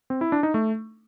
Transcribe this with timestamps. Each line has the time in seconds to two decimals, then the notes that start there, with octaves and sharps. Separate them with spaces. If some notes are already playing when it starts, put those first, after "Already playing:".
0.10 C4
0.21 E4
0.32 D4
0.43 D#4
0.54 A3